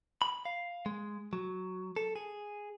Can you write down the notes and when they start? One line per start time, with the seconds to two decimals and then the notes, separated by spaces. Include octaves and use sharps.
0.22 B5
0.45 F5
0.86 G#3
1.33 F#3
1.96 A4
2.16 G#4